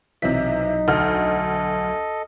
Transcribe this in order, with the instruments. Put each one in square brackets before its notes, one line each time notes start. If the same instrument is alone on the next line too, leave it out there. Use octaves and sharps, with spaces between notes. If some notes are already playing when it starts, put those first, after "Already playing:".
[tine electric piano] B1 F#3 B6 [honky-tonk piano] C3 E3 [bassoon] D#4
[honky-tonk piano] D2 F6 [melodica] A4 D#5